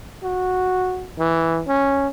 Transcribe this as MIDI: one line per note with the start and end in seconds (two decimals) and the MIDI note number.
0.23 1.09 66
1.19 1.62 52
1.68 2.08 61